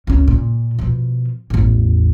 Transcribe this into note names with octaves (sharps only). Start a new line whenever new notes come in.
C#2 C#4
A#2
B2 F3
A1 E2